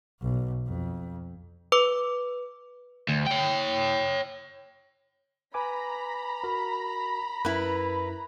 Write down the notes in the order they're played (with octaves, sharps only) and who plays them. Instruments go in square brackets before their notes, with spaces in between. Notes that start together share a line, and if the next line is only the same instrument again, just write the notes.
[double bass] B1
F2
[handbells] B4 D6
[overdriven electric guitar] D2
C#5 G5
[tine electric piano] B4 G#5 D6 [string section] A#5 B5
[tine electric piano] F#4 A#4
[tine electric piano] F#2 A#4 [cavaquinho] E4 B4